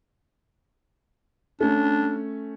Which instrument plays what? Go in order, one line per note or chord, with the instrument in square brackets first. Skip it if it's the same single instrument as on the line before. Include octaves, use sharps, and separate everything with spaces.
[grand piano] A3 C#4 [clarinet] D4